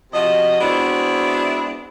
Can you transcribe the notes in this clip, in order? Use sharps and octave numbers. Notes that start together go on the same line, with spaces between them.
C3 F3 F#4 D#5
G#3 B3 C4 D4 E4 F#4